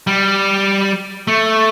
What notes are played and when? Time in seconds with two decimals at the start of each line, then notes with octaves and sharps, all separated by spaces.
0.07 G3
1.27 A3